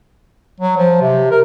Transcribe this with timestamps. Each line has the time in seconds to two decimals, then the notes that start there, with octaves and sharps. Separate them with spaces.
0.60 F#3
0.77 F3
1.01 C3
1.31 A#4